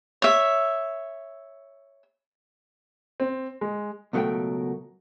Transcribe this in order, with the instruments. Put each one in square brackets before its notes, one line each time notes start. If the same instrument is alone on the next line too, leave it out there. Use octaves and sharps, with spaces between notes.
[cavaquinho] C#5 E5
[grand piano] C4
G#3
[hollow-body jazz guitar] C#2 B2 F#3 A3 A#4 G5